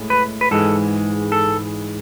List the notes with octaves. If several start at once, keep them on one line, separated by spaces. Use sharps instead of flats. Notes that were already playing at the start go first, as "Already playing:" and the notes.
Already playing: A2 G#3
B4
B4
G#2 E3 G#3 A4
A4